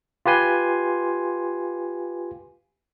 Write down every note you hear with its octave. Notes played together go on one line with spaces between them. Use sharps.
F4 G4 B4 G#5 C6